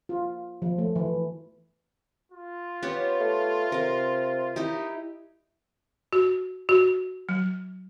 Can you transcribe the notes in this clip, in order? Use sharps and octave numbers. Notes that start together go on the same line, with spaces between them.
F4
F3
A3
E3
F4
B3 G4 C#5
A3
C3 A#4 F5
D#4 E4 G4
F#4
F#4
F#3